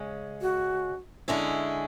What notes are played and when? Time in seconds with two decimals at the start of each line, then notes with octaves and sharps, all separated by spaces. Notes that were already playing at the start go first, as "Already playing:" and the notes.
Already playing: C#3 G#3 C#4
0.42 F#4
1.28 D3 G#3 C#4 E4